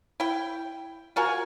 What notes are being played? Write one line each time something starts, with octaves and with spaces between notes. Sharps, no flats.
E4 G5
F4 F#4 A#4 G#5